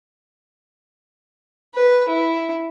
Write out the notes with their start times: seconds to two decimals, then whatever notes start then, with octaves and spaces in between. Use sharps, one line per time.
1.74 B4
2.08 E4